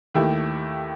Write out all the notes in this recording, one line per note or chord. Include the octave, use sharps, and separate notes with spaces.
D#2 D#3 A3 E4 G4